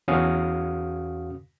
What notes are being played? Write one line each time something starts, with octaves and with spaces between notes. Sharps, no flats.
E2 C#4 F#4 F5 D#6